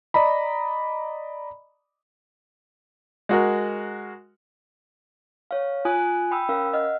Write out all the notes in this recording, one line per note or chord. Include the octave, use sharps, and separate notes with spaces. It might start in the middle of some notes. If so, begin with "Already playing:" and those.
D5 D#5 A#5 B5
G#3 F#4 A#4
C#5 F5
F4 G#5 D#6 F#6
G5 B5 D#6 E6
C#4 A#4 F5 E6
D#5 F#5 F6